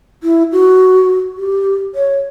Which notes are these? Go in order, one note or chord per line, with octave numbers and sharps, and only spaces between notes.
E4
F#4
G4
C#5